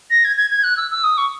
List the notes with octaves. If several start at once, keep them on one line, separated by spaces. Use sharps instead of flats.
A#6
G#6
G#6
G#6
F#6
E6
E6
D#6
C#6